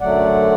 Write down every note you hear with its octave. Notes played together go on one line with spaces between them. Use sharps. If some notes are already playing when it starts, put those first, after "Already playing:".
F#2 D3 F#3 A3 D5 F#5